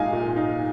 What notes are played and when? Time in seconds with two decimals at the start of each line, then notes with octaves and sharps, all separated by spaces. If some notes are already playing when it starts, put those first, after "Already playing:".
Already playing: A#2 G#3 D#4 F5 G#5
0.13 A#2
0.36 D#4